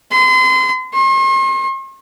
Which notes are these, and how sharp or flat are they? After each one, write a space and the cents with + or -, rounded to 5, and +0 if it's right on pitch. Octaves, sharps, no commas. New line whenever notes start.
C6 -35
C6 +45